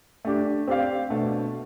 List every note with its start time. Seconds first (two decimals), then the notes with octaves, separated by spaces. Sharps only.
0.25 A3 D4 G4
0.67 C4 G4 D5 F5
1.09 B2 A3 D4